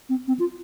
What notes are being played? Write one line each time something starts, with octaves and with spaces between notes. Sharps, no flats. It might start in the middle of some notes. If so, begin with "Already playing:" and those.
C4
C4
F4